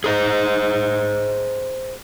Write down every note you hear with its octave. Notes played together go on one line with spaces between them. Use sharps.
G#4 C5 D#5